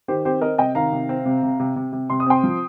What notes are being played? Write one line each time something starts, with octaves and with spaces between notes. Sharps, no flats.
D#3 G4 C5
C4 G4 C5
C4 A#4 D#5
C3 D#5 G5
D#3 F5 A#5
C3
C4
C3
C3
C3
C3
C3
C3 C6
D#6
C4 G5 C6
F3